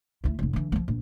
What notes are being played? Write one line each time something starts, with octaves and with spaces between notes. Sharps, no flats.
D2 E4
F1 D#2
D3 E3
F3 F#3
A#1